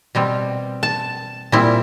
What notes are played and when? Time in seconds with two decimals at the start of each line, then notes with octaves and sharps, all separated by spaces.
0.15 B2 G3 C4
0.83 A5
1.52 A#2 G3 C4 E4